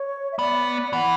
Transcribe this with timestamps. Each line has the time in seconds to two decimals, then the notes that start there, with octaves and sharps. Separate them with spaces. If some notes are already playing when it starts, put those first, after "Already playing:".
Already playing: C#5
0.32 E5
0.39 B3 D5
0.93 E3 F#5